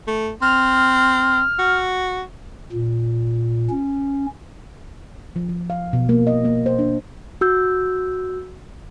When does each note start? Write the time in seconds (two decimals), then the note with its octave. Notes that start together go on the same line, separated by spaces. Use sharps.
0.07 A3
0.42 C4 F6
1.59 F#4
2.72 A#2
3.70 C#4
5.36 F3
5.49 F3
5.70 F5
5.93 B2
6.09 A#3
6.27 D#5
6.45 A#3
6.66 C5
6.79 D4
7.41 F#4 E6 G6